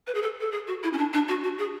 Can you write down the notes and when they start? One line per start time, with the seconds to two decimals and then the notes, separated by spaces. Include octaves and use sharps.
0.07 B4
0.15 G#4
0.22 A4
0.41 A4
0.52 G#4
0.67 F#4
0.83 E4
0.93 C#4
0.98 D4
1.13 D4
1.28 F#4
1.44 F#4
1.58 G#4